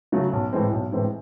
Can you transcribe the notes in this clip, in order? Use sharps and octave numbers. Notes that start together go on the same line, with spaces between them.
C#3 F#3 A3
B1
A2 E3 G#3 C4
B1
A2 E3 G#3 C4